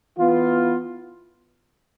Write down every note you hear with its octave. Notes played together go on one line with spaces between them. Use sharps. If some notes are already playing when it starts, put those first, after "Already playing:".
E3 B3 F4